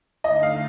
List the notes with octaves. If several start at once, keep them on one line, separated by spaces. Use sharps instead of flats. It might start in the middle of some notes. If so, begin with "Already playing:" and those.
D3 A3 D#4 D#5
F5